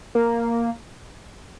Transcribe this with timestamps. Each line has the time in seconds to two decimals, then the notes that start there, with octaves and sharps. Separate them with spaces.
0.15 A#3